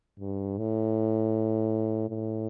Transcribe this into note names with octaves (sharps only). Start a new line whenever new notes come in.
G2
A2
A2